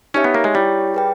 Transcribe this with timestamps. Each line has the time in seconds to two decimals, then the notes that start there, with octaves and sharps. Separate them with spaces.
0.14 C#4 D#4 G4 C#5 E5
0.24 B3
0.34 A#3
0.44 G#3
0.54 G3 E4 G4 C#5
0.94 G#4 B4 G5